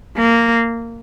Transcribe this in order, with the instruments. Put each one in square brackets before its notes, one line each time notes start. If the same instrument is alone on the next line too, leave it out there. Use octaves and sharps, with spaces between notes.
[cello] A#3